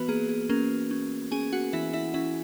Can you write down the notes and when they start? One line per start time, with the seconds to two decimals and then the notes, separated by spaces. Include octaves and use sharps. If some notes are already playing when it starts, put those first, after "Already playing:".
Already playing: E3 B3 F#4 B4
0.08 A#3 G#4
0.29 G#4
0.49 A#3 C#4 A#4
0.91 C#4
1.31 C#4 G#4 G#5
1.52 F#4 F#5
1.73 E3 E4 E5
1.93 E4 E5
2.14 C#4 E4 E5